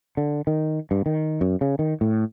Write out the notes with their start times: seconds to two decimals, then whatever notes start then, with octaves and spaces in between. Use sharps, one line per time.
0.17 D3
0.47 D#3
0.91 G2
1.06 D#3
1.41 F#2
1.61 C#3
1.79 D#3
2.01 A2